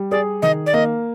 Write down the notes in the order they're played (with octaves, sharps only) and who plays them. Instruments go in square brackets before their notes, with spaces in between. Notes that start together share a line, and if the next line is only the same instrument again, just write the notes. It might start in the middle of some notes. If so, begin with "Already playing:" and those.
Already playing: [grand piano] G3
[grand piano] G#4 [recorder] D5
[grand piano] D#3 [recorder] D#5
[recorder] D5
[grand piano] A#3 [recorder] D#5